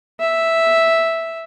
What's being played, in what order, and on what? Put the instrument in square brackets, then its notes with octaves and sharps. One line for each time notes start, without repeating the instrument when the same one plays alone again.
[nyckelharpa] E5